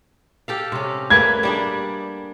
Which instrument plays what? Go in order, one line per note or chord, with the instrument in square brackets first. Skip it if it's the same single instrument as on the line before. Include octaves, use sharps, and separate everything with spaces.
[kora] G4 A4 F5
C3 C#4
[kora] A3 A#3 B4 [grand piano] G#6
[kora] G3 D4 G#4